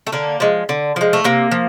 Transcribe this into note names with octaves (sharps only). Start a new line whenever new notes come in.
A3
D3 A#3
F3 G#3
D3
F3 G#3
A3
C3 A#3
F3